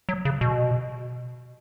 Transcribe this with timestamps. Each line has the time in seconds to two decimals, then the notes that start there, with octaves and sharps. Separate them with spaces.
0.09 F#3
0.25 C#3
0.41 B2